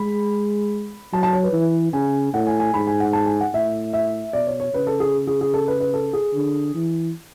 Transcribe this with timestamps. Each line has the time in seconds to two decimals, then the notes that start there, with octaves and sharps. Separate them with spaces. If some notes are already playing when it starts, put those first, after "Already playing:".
Already playing: G#3 B5
1.13 F#3 A5
1.23 A5
1.33 C#5
1.43 B4
1.53 E3
1.93 C#3 G#5
2.33 A2 F#5
2.47 G#5
2.60 G#5
2.74 G#2 B5
2.87 G#5
3.00 F#5
3.13 A5
3.26 G#5
3.41 F#5
3.54 A2 E5
3.93 E5
4.33 B2 D5
4.47 C#5
4.60 C#5
4.73 C#3 B4
4.87 A4
5.00 G#4
5.27 G#4
5.41 G#4
5.54 A4
5.68 B4
5.80 B4
5.94 A4
6.13 G#4
6.34 D3
6.74 E3